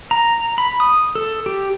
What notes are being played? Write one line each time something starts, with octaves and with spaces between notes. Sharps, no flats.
A#5
B5
D#6
A4
G4